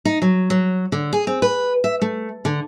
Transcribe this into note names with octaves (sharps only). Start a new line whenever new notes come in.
D#4
F#3
F#3
D3
G#4
C4
B4
E5
A3
D3